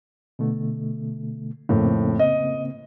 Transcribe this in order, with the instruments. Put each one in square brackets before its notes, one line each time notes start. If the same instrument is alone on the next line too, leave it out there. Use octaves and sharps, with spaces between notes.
[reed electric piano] B2 D3 A3
[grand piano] F2 A2 [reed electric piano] C#3 A#3 C4
[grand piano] D#5